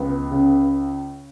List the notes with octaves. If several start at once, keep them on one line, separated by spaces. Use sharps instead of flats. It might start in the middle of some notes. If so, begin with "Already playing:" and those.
Already playing: C#2 B3
C#3